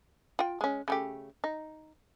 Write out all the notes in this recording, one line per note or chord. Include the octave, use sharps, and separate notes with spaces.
F4 G5
G#3 C#4
C#3 A3 G4
D#4